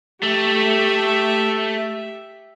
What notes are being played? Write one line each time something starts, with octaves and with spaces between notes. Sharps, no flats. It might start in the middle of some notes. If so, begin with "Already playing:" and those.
A3 G4 E5